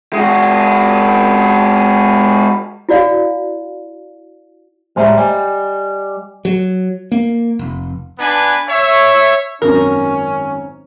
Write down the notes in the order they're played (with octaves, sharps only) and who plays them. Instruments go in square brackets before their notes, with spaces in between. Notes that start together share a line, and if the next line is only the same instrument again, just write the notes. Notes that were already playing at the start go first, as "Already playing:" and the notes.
[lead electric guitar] G#3 F#4
[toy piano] E4 F#4 D5 F5
[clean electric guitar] A2 G3 G#3 [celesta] C5 E5 A#5
[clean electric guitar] G3 [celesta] D#5 G#5
[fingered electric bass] F#3
A#3
F1
[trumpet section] B3 D4 B4 G#5
C#5 E5
[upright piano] G#1 F#2 [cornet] C#4 [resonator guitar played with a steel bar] A#4